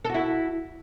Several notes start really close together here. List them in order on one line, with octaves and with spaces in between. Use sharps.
A4 F#4 E4